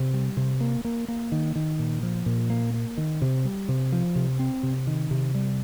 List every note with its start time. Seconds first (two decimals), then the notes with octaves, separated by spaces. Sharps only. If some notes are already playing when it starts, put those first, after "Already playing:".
Already playing: C3
0.14 G3
0.37 C3
0.61 A#3
0.85 A#3
1.08 A#3
1.32 D#3
1.56 D#3
1.79 A#2
2.03 F3
2.26 A#2
2.50 A#3
2.74 A#3
2.97 D#3
3.22 C3
3.45 G3
3.69 C3
3.92 F3
4.16 C3
4.39 C4
4.63 C3
4.87 D#3
5.11 C3
5.35 G3